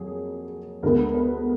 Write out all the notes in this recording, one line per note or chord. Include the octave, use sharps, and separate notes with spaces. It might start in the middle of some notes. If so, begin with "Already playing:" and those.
Already playing: F2 F#3 A#3 G#4
D2 D3 G#3 B3 A#4
B4